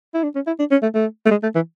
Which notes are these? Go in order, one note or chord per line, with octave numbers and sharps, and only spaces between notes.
E4
D4
C#4
E4
D4
C#4
A3
A3
A3
G#3
A3
E3